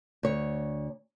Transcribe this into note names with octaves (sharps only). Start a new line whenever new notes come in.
D2 C#5